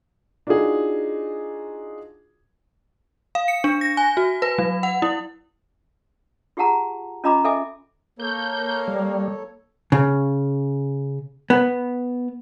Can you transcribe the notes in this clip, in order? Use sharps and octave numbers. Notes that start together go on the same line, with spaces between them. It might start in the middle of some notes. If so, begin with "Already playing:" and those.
D4 D#4 F4 F#4 G#4
F5
C#7
D4
A#6
G#5
F#4
B4
F#3
F#5
E4
F4 G4 G#4 F#5 A5 A#5
C#4 F4 D#5 A#5 B5 D6
A4 D#5 E5 G#5 D6
A#3 A4 C#5 G6
G3
C#3
B3